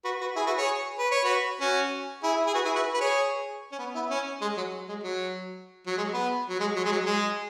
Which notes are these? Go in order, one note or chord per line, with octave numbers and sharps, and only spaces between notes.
F#4 B4
F#4 B4
E4 G#4
F#4 B4
G#4 C#5
B4
C#5
F#4 B4
C#4 F#4
E4 G#4
G#4
F#4 B4
E4 G#4
F#4 B4
B4
G#4 C#5
C#4
B3
B3 E4
C#4
G#3
F#3
G#3
F#3
F#3
G#3
B3
F#3
G#3
F#3
G#3
F#3
G#3